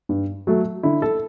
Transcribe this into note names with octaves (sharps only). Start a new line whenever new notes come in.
G2
F#3 A3
D3 E4
A4